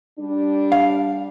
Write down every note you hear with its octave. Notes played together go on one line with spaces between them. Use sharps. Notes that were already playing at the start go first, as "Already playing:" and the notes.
G3 D4
F5